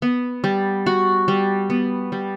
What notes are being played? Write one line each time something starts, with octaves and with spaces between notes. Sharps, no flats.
B3
G3
F#4
G3
B3
G3